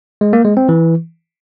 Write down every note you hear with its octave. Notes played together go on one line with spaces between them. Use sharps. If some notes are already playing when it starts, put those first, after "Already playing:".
G#3
A#3
G#3
C4
E3